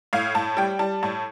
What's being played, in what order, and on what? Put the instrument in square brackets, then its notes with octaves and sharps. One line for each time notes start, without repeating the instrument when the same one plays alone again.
[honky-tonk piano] A2 F5
A2 A5
G3 G5
G3 A5
A2 A5